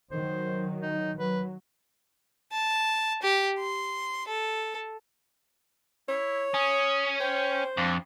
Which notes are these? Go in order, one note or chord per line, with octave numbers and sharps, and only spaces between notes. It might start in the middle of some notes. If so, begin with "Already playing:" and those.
D#3 F#3 C5
D#4
F#3 B4
A5
G4
C6
A4
E4 C#5
C#4 D#6
C5 G5
F2 D4